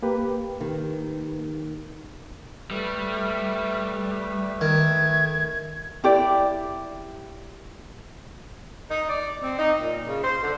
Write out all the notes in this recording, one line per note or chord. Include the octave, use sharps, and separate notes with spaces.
A#3 G4 B4
D#3
G3 A3 B4 E5
D#3 G#6
E4 G4 D5
D#4
D5
C4
D#4
A#2
C#3
C5
D3